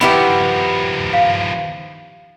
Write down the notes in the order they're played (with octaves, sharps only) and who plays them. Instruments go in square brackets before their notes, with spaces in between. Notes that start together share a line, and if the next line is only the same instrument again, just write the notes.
[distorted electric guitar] D#3 F3 [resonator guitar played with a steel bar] B3 E4 G4 [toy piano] B4 B5
[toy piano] F5